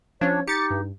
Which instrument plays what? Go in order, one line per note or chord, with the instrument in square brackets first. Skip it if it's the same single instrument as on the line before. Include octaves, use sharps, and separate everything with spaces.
[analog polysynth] F3 C#4 [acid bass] D4 [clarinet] C#5
[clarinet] D#4 [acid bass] G4 [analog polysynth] A6 C#7
[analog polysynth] G2